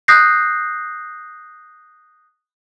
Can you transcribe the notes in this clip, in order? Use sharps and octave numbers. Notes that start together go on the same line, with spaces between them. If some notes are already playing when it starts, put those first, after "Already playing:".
D#6 F#6 G6 A#6 C7